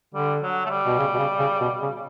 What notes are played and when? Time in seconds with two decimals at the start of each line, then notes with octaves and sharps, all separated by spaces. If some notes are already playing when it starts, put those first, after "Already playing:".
0.14 D3 G3
0.42 F#3
0.65 A3
0.70 G3
0.86 B2
0.98 C#3
1.14 B2
1.18 C#3
1.39 C#3
1.61 B2
1.82 C#3